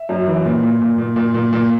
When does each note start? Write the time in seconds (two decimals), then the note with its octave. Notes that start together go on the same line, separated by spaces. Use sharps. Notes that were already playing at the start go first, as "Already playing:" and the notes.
Already playing: E5
0.09 F#2
0.27 E3
0.45 A#2
0.63 A#2
0.82 A#2
0.98 A#2
1.16 A#2
1.34 A#2
1.53 A#2